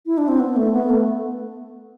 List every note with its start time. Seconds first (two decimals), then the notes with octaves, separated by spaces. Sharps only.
0.06 E4
0.18 D4
0.28 C4
0.40 B3
0.56 A3
0.73 B3
0.90 A3